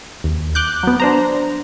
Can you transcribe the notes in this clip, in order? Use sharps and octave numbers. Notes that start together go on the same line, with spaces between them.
D#2
D6 F#6 G6
F#3 B3
D4 C5 A#5